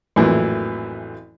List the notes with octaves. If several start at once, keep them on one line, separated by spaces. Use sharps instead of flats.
A1 F2 A#2 E3 F#3